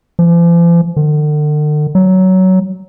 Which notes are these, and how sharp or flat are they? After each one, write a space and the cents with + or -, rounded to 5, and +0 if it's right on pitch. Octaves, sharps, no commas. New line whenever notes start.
F3 -45
D3 +40
F#3 +15